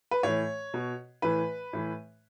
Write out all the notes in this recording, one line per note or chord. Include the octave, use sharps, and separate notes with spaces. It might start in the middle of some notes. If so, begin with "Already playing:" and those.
B4
A2 E3 C#5
B2
A2 E3 B4
A2 E3